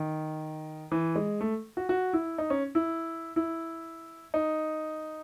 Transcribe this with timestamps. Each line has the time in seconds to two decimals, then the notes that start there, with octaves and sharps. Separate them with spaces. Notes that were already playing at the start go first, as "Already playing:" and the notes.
Already playing: D#3
0.92 E3
1.16 G#3
1.41 A3
1.77 F#4
1.89 F#4
2.13 E4
2.38 D#4
2.50 C#4
2.75 E4
3.36 E4
4.34 D#4